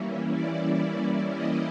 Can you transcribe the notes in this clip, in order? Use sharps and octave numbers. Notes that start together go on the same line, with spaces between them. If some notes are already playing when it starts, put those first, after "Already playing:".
Already playing: E3 G3 A#3 C#4 E4
D5
D#5